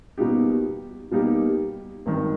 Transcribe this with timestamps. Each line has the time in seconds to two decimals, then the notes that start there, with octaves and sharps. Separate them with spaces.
0.18 B2 G3 A#3 D#4 G4
1.11 B2 G3 A#3 D#4 G4
2.06 G#1 G2 D#3